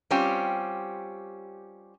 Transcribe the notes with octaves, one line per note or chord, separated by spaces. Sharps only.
G3 C4 C#4 F4 G4